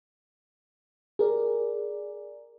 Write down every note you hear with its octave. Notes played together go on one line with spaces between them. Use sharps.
G#4 A#4 D5